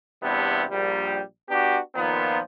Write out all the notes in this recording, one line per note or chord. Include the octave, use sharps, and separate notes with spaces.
E2 G2 C3 B3
A#1 G3
B3 D4 F#4 G4
A#2 D#3 F3 B3